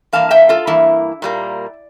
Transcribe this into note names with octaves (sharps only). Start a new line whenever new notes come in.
G2 E3 A#3 F5 A5
E5 G5
F4 A4
G2 E3 A#3 E4
A#2 G3 A#3